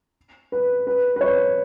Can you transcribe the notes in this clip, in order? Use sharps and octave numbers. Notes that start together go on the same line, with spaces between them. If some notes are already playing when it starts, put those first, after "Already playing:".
B4
B4
B4
C#5